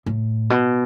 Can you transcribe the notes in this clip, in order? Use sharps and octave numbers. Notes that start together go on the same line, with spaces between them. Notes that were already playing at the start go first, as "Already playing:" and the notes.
A2
B2